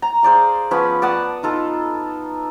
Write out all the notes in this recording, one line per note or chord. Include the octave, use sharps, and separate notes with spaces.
A#5
G#4 C5 D5 F5
F3 B3 C#4 B5
D5 F#5 A5 D#6
D#4 F4 A4